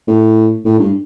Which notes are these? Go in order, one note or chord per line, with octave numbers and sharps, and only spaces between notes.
A2
A2
G2